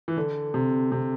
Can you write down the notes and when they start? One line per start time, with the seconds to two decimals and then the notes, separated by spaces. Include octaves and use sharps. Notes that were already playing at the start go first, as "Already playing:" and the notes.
0.08 E3
0.17 D3
0.54 C3
0.92 C3